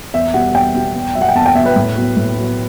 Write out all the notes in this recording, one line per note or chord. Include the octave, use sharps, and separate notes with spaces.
E2 E5
B2 G3 B3 F#5
E2 G5
B2 G3 B3
E2
B2 F#3 B3 E5
F#5
G5
E2 A5
G5
B2 F#3 B3 E5
B4
A2
F#3 B3
A2
F#3 B3